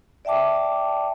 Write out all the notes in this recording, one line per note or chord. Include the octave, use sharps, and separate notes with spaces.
D5 E5 G5 A5 D6